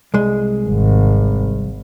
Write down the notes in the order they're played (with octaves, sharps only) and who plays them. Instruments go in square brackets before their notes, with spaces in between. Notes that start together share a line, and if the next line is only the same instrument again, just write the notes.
[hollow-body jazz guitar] C2 G#3
[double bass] G#1